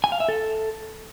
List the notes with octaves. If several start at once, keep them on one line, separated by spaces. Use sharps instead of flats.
G#5
F5
E5
A4